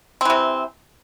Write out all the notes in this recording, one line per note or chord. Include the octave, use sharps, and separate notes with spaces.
C3 E3 C4